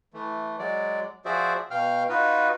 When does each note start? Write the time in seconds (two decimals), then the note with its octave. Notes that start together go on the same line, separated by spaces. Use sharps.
0.14 E3 A3
0.59 F#3 G#3 D5
1.25 F3 F#4 G#4 C5 D5 E5
1.71 B2 F5 G5 F6
2.09 D#4 F4 F#4 B4